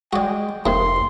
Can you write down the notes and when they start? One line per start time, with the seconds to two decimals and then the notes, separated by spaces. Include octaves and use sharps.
0.13 G#3 F#4 D5 G5
0.66 F1 D#2 C3 C6